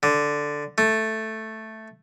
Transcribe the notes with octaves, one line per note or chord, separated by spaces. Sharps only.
D3
A3